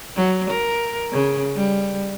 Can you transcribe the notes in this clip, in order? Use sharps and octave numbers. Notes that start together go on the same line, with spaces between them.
F#3
A#4
C#3
G3